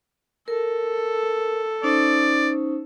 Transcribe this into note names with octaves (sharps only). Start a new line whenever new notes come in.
A4 A#4
C#4 D#4 C5 D5